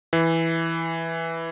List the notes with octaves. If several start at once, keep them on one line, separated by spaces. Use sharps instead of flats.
E3